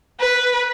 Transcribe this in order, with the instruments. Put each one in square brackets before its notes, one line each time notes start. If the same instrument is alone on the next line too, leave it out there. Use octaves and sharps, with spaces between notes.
[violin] B4